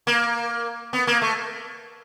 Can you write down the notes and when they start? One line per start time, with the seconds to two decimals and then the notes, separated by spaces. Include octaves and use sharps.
0.07 A#3
0.93 B3
1.07 A#3
1.22 A3